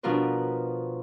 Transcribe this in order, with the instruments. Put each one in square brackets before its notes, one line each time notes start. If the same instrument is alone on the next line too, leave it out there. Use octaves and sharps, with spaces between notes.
[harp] B2 F3 D4 F4 A#4 B4